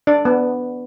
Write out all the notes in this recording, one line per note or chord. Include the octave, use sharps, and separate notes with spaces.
D4 D5
B3